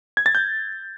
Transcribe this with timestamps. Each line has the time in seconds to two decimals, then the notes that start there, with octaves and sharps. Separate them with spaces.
0.17 G#6
0.26 A6
0.35 G6